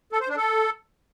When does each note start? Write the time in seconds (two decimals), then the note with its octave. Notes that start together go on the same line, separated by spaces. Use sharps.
0.12 A4
0.20 C5
0.29 D4
0.37 A4